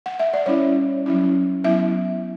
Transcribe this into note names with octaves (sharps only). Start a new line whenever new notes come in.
F#5
E5
D5
G3 C#4 E4 C#5
F#3 C#4 E4
F#3 B3 E4 E5